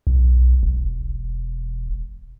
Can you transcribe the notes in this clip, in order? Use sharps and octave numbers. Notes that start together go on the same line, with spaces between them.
B1
E1